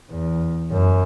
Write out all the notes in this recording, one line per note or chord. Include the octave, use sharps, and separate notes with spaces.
E2
F#2